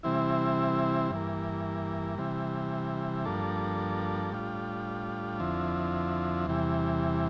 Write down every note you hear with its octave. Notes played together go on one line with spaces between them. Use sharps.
C3 E3 G3 C4 E4
G2 E3 A#3
C3 E3 G3
G2 F3 A#3 D4 A4
A2 G3 D4 F4
F2 D3 F3 C4 E4
E2 C3 E3 G3